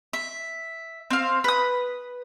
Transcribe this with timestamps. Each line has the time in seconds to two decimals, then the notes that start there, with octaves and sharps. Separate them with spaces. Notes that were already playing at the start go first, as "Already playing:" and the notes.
0.13 E5
1.10 C4 F5
1.44 B4 D#6